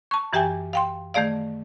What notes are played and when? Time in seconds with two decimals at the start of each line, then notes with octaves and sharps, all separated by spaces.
0.11 A5 C#6
0.33 F#2 E3 G4 E5 G5 G#5
0.73 F5 G5 C6
1.14 D#3 A3 G#4 D5 F5